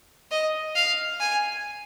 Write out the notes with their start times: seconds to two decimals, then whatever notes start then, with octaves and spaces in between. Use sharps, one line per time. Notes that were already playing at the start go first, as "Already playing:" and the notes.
0.31 D#5
0.75 F5
1.20 G#5